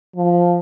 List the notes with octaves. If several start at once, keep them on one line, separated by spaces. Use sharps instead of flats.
F3